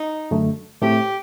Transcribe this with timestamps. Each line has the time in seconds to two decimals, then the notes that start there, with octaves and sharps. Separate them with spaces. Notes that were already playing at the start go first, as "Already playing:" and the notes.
Already playing: D#4
0.31 F#2 D3 A3
0.82 A2 A3 C4 G4